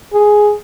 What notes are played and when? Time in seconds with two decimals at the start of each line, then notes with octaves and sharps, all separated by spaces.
0.13 G#4